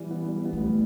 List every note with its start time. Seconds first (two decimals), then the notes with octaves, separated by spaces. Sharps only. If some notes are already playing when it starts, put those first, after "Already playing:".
Already playing: E3 G3
0.11 B3
0.28 G3
0.45 B3
0.53 A3
0.61 G3